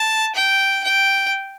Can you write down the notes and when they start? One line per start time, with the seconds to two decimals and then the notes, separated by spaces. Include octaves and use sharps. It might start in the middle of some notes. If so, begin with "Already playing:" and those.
Already playing: A5
0.35 G5
0.84 G5